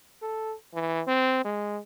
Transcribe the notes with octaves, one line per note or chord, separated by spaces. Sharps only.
A4
E3
C4
G#3